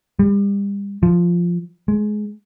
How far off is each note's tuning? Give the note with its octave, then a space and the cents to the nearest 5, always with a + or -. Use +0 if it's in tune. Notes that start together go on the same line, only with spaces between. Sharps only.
G3 +35
F3 -5
G#3 +20